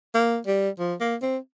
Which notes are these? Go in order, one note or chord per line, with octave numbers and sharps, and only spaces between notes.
A#3
G3
F3
A#3
C4